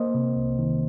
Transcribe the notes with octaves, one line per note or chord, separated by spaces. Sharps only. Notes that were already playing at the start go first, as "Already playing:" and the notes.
Already playing: A#3 C5 D#5
C3
C2
D#3